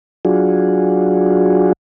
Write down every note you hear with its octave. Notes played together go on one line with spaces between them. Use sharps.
F#3 D4 F4 F#4 G#4